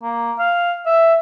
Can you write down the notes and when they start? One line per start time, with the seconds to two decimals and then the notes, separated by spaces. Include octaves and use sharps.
0.03 A#3
0.39 F5
0.86 E5